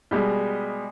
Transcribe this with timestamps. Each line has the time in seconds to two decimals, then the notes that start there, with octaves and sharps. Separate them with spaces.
0.11 B2 G3 G#3